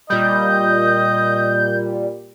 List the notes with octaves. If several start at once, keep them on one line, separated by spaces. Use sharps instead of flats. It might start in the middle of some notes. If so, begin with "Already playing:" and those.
A#2 G3 D#5 G6